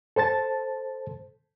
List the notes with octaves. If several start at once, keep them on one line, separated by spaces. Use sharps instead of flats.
A4 C5 A5 A6